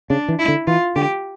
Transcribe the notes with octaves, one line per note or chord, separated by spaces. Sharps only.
C#3 D4
E3
E4
D3
E3 F4
D3 G4